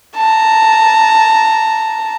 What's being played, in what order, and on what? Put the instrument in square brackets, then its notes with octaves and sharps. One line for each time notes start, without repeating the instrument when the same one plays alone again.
[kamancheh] A5 A#5